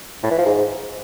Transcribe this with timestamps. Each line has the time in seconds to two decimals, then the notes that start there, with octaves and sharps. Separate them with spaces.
0.23 A2
0.31 E3
0.38 F3
0.46 G#2